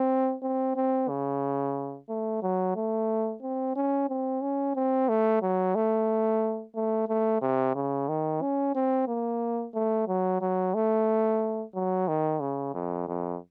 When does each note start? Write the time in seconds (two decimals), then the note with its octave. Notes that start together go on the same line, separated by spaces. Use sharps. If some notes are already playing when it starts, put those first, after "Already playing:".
Already playing: C4
0.43 C4
0.76 C4
1.09 C#3
2.09 A3
2.43 F#3
2.76 A3
3.43 C4
3.76 C#4
4.10 C4
4.42 C#4
4.76 C4
5.09 A3
5.42 F#3
5.76 A3
6.75 A3
7.08 A3
7.42 C3
7.75 C#3
8.09 D#3
8.42 C#4
8.75 C4
9.08 A#3
9.74 A3
10.08 F#3
10.41 F#3
10.75 A3
11.75 F#3
12.08 D#3
12.40 C#3
12.74 F2
13.08 F2